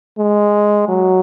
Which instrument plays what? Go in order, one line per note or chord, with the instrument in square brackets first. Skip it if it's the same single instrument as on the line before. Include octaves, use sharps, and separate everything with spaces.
[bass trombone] G#3
F#3